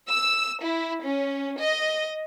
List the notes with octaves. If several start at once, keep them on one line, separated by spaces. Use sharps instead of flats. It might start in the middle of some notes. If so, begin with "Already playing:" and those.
E6
E4
C#4
D#5